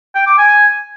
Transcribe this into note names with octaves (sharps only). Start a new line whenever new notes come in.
G5
D6
G#5